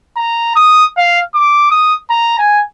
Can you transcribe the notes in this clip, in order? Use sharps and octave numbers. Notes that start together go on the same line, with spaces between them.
A#5
D#6
F5
D6
D#6
A#5
G#5